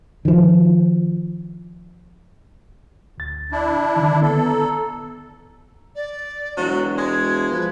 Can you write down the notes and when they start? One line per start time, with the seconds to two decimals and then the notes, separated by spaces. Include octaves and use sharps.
0.25 D#3 F3
3.18 D2 A6
3.52 D4 E4
3.96 D3 D#3
4.22 B3 A4
4.46 A#5
5.96 D5
6.57 E1 F#3
6.98 G#3 G#6
7.51 F3 B4